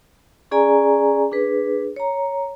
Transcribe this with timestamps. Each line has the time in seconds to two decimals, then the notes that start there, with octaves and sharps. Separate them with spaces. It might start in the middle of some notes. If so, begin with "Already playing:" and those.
0.51 C#4 G#4 D5 G#5 A#5
1.32 D4 G#4 B4
1.96 C#5 A#5